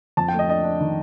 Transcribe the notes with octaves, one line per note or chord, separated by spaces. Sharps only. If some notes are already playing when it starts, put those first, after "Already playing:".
F2 A5
G5
A3 D#5
D4 D#5
D4
D#3